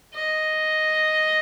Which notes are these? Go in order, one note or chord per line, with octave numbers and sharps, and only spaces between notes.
D#5